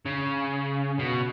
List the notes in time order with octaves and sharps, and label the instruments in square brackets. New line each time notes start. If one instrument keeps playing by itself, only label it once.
[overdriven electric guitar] C#3
B2